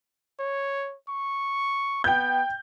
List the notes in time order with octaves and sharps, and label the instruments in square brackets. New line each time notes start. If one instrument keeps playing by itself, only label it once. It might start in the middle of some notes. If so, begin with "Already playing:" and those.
[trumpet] C#5
C#6
[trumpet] B3 [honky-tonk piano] G5 G6